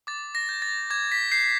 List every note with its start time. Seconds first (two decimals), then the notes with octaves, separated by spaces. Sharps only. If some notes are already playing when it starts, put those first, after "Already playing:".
0.07 D6 A6
0.35 A#6
0.49 G6
0.62 A6
0.90 D6 G#6
1.12 B6
1.32 G6 C7